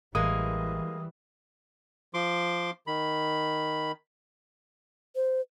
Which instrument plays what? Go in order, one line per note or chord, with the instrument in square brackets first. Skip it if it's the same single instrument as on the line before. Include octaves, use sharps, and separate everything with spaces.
[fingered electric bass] A1 [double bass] E3 G3 [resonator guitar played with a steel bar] G#3 A#3 [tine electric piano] D#6
[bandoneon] F3 C6 D6
D#3 B5
[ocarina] C5